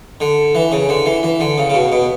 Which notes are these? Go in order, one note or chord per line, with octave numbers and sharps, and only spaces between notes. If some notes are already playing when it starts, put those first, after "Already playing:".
D3
E3
C#3
D3
E3
E3
D3
C#3
C#3
B2
B2